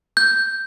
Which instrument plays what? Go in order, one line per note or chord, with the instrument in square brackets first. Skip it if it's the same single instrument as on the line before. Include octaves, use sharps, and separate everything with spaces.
[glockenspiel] G6